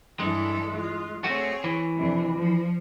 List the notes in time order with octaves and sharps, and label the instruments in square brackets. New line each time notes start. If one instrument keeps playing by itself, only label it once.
[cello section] G2 E3 A4 [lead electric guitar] G#3
[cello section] F4
[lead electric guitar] A3 F#4 [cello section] C4 G#4 C#5
[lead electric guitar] E3
[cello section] F2 C3 D4
F3